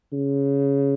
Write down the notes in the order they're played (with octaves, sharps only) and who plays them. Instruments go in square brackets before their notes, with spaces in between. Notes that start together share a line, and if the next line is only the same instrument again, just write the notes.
[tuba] C#3